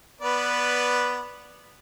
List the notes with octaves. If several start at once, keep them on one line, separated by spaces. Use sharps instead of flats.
B3 B4 D5